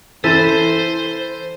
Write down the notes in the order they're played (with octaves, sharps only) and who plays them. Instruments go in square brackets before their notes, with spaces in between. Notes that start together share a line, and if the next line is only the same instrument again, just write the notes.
[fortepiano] E3 [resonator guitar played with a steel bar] A4 [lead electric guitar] C5 C6 [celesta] A6 B6 D#7